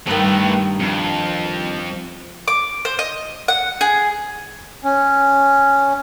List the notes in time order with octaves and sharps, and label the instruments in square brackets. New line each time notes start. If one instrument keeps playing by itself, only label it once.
[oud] G2 D#3 [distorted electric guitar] A3 B4
[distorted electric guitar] F2
[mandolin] D6
C5
D#5
F#5
G#4
[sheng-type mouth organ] C#4